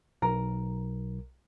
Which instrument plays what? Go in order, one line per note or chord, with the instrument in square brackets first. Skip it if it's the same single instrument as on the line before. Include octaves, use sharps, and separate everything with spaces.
[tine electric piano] B1 [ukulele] A#4